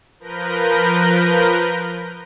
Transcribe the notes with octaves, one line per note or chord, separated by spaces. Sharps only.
F3 A#4 B4 G6 A#6